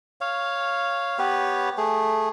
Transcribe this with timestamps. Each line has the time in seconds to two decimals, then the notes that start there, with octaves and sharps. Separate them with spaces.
0.21 C#5 F5
1.19 B3 G4 B4 C#5
1.77 A3 G#4